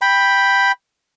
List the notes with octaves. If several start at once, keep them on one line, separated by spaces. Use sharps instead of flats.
G5 B5